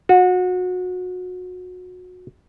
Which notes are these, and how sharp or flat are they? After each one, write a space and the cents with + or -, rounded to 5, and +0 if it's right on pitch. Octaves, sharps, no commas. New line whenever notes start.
F#4 -25